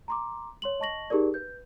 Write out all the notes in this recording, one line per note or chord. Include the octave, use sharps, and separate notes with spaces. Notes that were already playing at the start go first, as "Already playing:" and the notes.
A#5 C6 D6
C#5 C6 F#7
D#5 A5 C#6 A#6 F#7
D#4 G4 G#4 A#4 D5
B4 G6